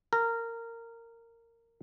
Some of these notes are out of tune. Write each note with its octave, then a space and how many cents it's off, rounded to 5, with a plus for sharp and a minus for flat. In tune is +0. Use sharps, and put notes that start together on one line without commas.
A#4 -15